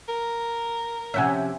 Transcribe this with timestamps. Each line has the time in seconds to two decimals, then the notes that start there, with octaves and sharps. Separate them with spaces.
0.09 A#4
1.14 C3 F3 C#4 E5 F#5 G#5